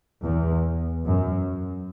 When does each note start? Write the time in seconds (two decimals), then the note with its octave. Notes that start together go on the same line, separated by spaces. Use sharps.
0.23 E2
1.04 F#2